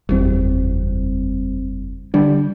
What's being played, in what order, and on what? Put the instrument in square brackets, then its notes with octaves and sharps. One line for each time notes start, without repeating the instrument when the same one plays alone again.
[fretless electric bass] F#1 E2 [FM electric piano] G3 C4
[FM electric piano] D3 D4 [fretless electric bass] G3